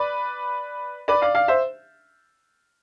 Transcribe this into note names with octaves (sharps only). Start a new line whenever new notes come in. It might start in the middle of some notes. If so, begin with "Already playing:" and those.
Already playing: B4 D5
B4 D5
D5 F5
D5 F5
C5 E5